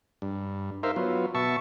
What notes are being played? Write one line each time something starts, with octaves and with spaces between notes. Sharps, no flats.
G2
D#4 A#4 C5 E5 F5
F#3 B3 F4
B2 E5 A5 C#6